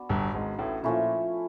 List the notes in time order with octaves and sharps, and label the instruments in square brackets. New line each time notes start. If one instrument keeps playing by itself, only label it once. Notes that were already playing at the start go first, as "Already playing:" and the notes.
Already playing: [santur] B3 D4 F#4
[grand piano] G1 G2
G#1 G#2
A1 A2
[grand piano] A#2 [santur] F3 A3 C#4 E4